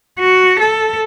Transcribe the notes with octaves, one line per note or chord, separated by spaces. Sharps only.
F#4
A4